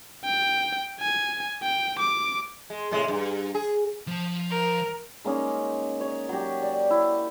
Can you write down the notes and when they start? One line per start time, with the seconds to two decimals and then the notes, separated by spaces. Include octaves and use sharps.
0.25 G5
1.01 G#5
1.63 G5
2.00 D6
2.70 G#3
2.91 A2 C3 G#3
3.08 G2
3.55 G#4
4.08 F3 A5
4.50 A#4
5.25 G#3 A#3 C#4 D#4
6.01 C#5
6.29 F#3 F#4 G4
6.62 D5
6.91 E4